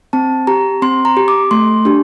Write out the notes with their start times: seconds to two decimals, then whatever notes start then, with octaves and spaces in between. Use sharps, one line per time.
0.13 C4 A5
0.47 G4 A#5
0.82 C4 C6
1.05 A#5
1.17 G4
1.28 D6
1.51 A3 C6
1.85 D4 G4